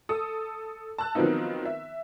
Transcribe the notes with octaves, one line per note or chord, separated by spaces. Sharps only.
A4 D#6
A5 E6 F#6
D#3 F3 F#3 B3 C4 D#4
E5